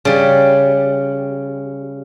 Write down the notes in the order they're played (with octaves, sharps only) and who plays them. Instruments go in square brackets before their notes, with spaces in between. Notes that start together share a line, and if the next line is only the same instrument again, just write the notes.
[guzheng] C#3 G3